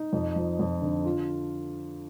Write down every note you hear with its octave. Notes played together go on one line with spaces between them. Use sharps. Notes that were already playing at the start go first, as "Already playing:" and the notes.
Already playing: D#4
F2
F3
F2
D3
F4